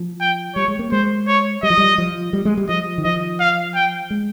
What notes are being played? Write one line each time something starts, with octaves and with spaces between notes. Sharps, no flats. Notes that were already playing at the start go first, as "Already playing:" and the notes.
Already playing: F3
G5
G3 C#5
G#3
A#3
G#3 C5
C#5
G3 D#5
F3
G3
F3
G3
G#3
G3
F3 D#5
D#3
F3 D#5
F5
G5
G#3